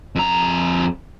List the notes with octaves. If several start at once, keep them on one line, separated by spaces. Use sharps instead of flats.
F2 A#5